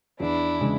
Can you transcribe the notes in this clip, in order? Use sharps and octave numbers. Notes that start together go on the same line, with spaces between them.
E2 D4 E4
C#3 E3 G#3